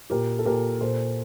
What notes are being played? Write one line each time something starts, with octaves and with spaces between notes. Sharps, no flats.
A#2 G4 A#4
A4
A#2 G4 A#4
A#2 A4 C5